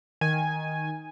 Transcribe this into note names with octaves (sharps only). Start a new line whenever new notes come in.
D#3 G#5